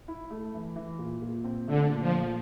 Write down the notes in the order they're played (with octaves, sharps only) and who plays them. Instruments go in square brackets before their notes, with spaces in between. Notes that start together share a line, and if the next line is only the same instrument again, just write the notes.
[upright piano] E4
A3
E3
E3
A#2
A#2
C4
[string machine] D3 [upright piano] A3
[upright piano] A#2
[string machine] F3
[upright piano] A#2